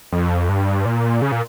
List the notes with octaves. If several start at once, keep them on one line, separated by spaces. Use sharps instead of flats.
F2
G2
A#2
C#3
A#2